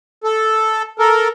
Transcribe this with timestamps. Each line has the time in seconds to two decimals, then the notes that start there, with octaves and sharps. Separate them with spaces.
0.24 A4
0.99 A4 A#4